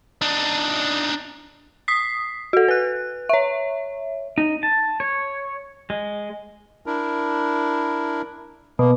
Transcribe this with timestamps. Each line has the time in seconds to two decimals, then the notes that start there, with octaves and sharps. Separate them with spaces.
0.22 D4 D#4
1.88 D#6 B6 C7
2.53 F#4 A4
2.68 B4 F#6
3.29 C#5 E5
4.38 D#4
4.63 A5
5.00 C#5
5.90 G#3
6.86 D4 E4 A#4
8.79 B2 A#3